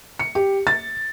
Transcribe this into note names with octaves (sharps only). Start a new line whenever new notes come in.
C#7
G4
A6